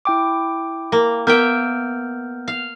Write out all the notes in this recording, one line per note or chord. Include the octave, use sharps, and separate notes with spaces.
E4 G5 D6
A#3
A#3 B3 E5 G5 F6 G6
F5